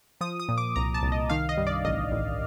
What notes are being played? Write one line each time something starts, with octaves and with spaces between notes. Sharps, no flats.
F3 D#6
D#6
A#2
D6
C2 A#5
A5
C2
D#5
D#3 F5
D#5
G2
D5
A1 D#5
A1